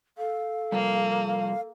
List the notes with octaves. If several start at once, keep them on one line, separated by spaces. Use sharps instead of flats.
A4 F5
C3 F3 G3 A#3
F5